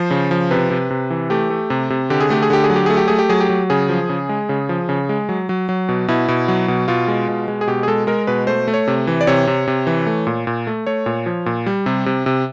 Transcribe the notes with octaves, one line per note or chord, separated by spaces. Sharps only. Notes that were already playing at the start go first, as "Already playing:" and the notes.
Already playing: F3 C5
C#3
F3
C3 B4
C3
C3
E3
A3 G4
A3
C3
C3
D3 G4
G#4
A3 G4
G#4
D3 G4
G#4
F#3
G4
A3 G#4
G4
A3 G#4
G4
F#3 G#4
G4
F#3
C#3 G#4
F3
C#3
G#3
C#3
F3
C#3
G#3
F#3
F#3
F#3
B2
B2 E4
B2
F#3
B2
B2 F4
G#3
B2
G#3
G#4
B2 G4
G#4
G#3 A4
G#3 A#4
B2 B4
A3 C5
A3
C#5
C3
E3
D5
C3 C#5
C3
C3
E3
A3
A#2
A#2
A3
A3 C#5
A#2
F3
A#2
G3
C3
C3
C3